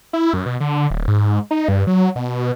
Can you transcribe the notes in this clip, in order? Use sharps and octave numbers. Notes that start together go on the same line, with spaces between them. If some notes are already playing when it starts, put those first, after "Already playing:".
E4
F#2
B2
D3
D1
G#2
D#4
G2
F#3
B2